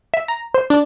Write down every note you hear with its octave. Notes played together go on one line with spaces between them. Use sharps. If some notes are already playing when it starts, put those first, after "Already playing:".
E5
A#5
C5
D4